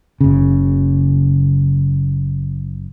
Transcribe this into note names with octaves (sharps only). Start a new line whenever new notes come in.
F#1 C#3